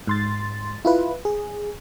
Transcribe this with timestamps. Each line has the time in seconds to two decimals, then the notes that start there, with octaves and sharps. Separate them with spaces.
0.07 G#2 C6 A6
0.85 E4 F4 B4
1.25 G#4